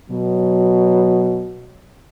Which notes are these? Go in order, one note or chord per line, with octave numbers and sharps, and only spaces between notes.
B2 F#3